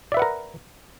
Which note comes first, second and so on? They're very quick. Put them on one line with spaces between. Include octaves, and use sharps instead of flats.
D5 E5 B4 F#5 A#4